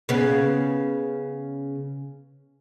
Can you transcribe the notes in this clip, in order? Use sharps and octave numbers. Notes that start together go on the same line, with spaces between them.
C#3 B3